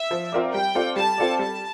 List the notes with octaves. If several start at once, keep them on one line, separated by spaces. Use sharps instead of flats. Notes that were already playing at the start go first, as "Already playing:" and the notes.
Already playing: E5
F3
C4 F4 A#4 D5
G3 G5
C4 F4 A4 D5
G3 A5
C4 F4 A4 D5
G3 A5